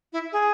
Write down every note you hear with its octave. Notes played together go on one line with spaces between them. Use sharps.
E4
G#4